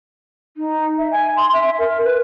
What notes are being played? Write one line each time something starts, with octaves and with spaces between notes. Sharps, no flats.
D#4
E5
G#5
C6
E5
A#4
B4